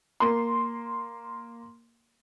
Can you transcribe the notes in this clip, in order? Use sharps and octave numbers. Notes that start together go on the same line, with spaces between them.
A#3 C6